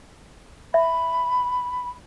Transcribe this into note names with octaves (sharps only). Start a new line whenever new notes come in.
E5 B5